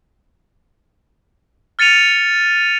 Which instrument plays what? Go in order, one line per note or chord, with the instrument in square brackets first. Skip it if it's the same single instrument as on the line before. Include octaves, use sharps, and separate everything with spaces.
[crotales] F6 A6 C#7 D#7 F7